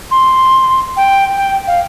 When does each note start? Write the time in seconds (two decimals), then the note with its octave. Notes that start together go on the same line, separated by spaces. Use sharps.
0.11 C6
0.97 G5
1.37 G5
1.67 F5